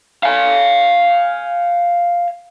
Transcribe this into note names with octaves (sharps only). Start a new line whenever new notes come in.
F5 G#5